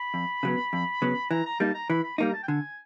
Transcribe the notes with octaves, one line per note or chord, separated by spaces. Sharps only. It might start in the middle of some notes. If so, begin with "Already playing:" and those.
Already playing: B5
F2
C#3 F#3 B3
F2
C#3 F#3 B3
E3 A#5
A#5
G3 A#3 D#4 A5
A#5
E3 B5
B5
G3 A#3 D#4 A#5
A5
G5
D3 G#5